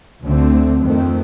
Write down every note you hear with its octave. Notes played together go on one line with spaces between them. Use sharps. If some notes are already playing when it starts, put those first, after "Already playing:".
D2 D3 A3 C4
F2 D#3 A3 C4